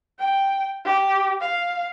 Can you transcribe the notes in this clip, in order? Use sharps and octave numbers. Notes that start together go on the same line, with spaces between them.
G5
G4
F5